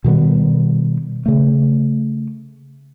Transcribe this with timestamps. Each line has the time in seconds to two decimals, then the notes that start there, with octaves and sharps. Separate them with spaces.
0.04 B2 D#3 G3 B3
1.26 C#3 A3